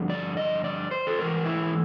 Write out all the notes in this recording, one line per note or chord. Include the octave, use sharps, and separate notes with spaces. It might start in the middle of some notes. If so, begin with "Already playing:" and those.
Already playing: G2 D3 F3
D5
D#5
D5
C5
A4
G#2 E3 A#4
E4